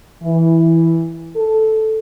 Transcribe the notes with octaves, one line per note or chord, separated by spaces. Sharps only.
E3
A4